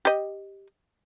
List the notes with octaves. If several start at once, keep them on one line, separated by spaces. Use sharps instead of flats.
G4 D#5